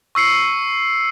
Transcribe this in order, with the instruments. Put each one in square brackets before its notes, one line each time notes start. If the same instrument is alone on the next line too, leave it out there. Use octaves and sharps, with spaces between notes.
[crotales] C#6 E6 C7 C#7